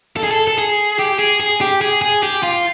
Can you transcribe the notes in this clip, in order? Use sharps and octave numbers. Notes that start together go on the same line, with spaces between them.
A4
G#4
A4
A4
G#4
G4
G#4
G#4
G4
G#4
G#4
G4
F4